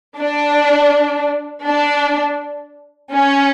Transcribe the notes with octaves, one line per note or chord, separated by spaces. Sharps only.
D4
D4
C#4